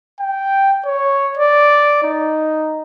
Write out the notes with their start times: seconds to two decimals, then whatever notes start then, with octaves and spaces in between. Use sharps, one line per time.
0.20 G5
0.85 C#5
1.37 D5
2.03 D#4